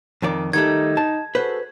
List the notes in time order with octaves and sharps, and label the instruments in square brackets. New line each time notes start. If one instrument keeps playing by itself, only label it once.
[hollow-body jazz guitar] F2 D#3 D5
[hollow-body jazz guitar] D#3 G3 A3 [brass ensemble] D#4 [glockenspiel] G#6
[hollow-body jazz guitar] A5
[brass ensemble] F#4 G#4 A4 [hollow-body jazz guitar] B4 C5